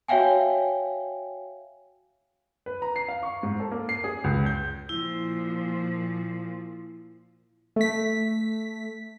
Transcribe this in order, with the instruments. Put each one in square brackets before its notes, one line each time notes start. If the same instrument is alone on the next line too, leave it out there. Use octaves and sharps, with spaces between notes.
[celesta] F#4 C#5 E5 F5 G5 G#5
[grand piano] B4
A#5
C7
F5
C#6
G#2
A4
A#3
C7
G#4
C#2
G6
[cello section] A#2 F3 [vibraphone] E4
[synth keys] A3 B6